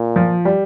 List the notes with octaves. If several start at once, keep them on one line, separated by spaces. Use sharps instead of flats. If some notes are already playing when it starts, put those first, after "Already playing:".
Already playing: A#2
F3
G3